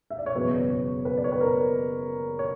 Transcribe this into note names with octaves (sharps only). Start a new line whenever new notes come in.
E5
D5
C#5
F#1 E2 B2 F#3 B4
C#5
B4
D5
C#5
B4
A#4
C#5